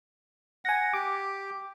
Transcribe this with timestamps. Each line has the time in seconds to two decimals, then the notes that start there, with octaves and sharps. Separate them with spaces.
0.65 F#5 G#5 A#6
0.93 G4 D6